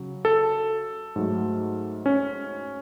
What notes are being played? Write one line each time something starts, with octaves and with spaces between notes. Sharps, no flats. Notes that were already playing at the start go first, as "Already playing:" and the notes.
Already playing: C#3 F#3
A4
G#2 F#3 A3
C#4